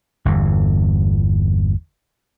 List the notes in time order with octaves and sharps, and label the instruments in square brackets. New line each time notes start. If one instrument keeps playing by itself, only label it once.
[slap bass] G1 E2